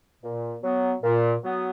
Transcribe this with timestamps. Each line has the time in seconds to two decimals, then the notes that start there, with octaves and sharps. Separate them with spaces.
0.23 A#2
0.62 F#3 B3
1.03 A#2
1.42 F#3 B3